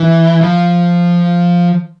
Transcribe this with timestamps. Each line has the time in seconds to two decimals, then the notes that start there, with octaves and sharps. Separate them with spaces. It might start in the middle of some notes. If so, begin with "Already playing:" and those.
Already playing: E3
0.41 F3